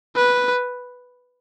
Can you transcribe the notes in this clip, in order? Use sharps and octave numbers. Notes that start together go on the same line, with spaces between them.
B4